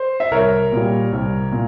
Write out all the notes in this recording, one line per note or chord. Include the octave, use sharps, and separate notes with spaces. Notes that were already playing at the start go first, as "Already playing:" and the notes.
Already playing: C5
E5
C2 A#4 C#5
A#2 G3
C2
A#2